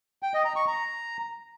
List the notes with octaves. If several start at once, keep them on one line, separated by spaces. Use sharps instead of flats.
G5
D#5
A#5
C#6
A#5